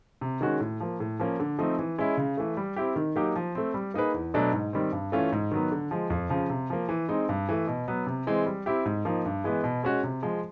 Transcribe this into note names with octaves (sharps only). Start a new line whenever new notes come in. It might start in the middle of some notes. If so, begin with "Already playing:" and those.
C3
D#3 G#3 C#4 F#4
A2
F3 A#3
A2
F3 A#3 C#4
D3
F3 A3 C4 D#4
E3
G#3 C#4 E4
C#3
E3 A3
G3
C4 E4 G4
D#3
F#3 A#3 D#4 G4
F3
A3 C4
G3
A#3 D#4 G#4 B4
E2
B2 F#3 A3 D4
G#2
D#3 G3 C4
G2
E3 A3 C#4 F4
G#2
D#3 F#3 B3
D3
F3 G#3
F2
C#3 F3
C3
F3 A#3
E3
G#3 C4 D#4
G2
E3 A3
B2
F#3 B3
C3
E3 G#3 C4
G3
C4 E4 G4
G#2
F3 A#3 D#4
G2
E3 G#3 B3
B2
G#3 C#4 F#4
C3
F3 G#3